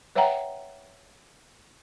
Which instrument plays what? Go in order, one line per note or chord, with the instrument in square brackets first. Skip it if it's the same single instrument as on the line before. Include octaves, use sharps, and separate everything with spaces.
[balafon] B4 C#5 E5 F#5 G5 A#5